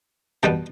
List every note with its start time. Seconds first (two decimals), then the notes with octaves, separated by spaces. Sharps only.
0.43 B2 G3 B3 G5 A5